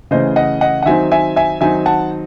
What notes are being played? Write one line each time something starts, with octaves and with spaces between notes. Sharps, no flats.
C#3 E3 A3 C5 D#5
D#5 F#5
D#5 F#5
F#5
D#3 F#3 C4 D#4 E5 G#5
E5 G#5
E5 G#5
D#3 F#3 C4 D#4 E5 G#5
F#5 A5